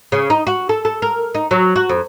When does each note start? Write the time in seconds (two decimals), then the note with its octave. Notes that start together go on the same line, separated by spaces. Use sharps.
0.12 C#3
0.30 D#4
0.47 F#4
0.69 A4
0.85 A4
1.02 A#4
1.35 D#4
1.51 F#3
1.76 F#4
1.89 F2